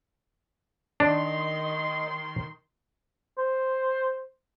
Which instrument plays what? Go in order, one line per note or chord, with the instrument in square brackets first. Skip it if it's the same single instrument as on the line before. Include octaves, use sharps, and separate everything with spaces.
[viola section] D#3 C6 [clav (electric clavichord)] D4 [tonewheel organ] D#5
[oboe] C5